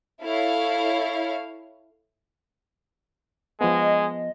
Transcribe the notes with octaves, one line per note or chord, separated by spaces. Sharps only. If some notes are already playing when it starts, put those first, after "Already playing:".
E4 A4 C#5 F5
F3 G#3 B3 D#5